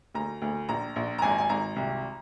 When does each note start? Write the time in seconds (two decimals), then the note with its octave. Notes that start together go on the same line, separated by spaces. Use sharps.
0.14 D2 A#5
0.42 D2
0.69 A#1 A#5
0.96 A#1
1.18 A#5
1.22 G#1 G#5
1.38 G#5
1.49 G#1 A#5
1.76 C2